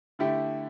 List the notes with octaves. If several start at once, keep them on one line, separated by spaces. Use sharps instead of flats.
D3 A3 E4 G4